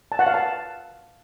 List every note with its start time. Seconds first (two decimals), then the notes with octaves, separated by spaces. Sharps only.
0.12 A5
0.19 F#5
0.27 F5
0.34 A5